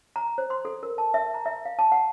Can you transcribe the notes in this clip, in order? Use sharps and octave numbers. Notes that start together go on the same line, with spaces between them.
A#5
C5
C6
A4
A#4
A5
E5
A#5
E5
F5
A5
F#5